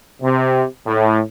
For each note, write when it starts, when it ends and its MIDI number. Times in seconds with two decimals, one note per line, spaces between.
0.22 0.63 48
0.86 1.20 45